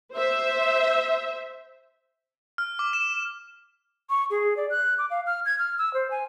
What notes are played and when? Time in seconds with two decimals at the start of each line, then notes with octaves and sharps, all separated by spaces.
0.13 C5 E5
2.58 F6
2.79 D6
2.93 E7
4.10 C#6
4.31 G#4
4.57 D5
4.70 F#6
4.98 D6
5.11 F5
5.26 F6
5.45 G#6
5.59 F6
5.78 E6
5.94 C5
6.11 G#5